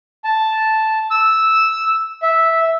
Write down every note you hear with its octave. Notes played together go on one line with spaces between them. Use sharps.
A5
E6
E5